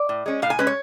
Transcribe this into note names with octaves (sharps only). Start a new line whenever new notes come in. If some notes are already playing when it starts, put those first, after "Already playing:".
Already playing: D5
A2
G#3 C#4
A2 F5
G#5
G#3 C#4 B4
C#5